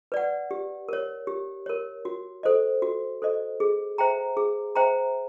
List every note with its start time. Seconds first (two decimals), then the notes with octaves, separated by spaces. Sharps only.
0.12 B4 D5 F#5
0.51 G4
0.89 A#4 C#5
1.27 G4
1.66 A#4 C#5
2.05 F#4
2.43 A4 C5 D#5
2.82 F#4
3.22 A4 C5 D#5
3.60 G#4
3.98 C5 E5 G5 A#5
4.37 G#4
4.75 C5 E5 G5 A#5